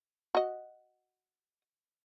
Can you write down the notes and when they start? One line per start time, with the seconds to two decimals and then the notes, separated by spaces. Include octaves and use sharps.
0.35 F#4 D#5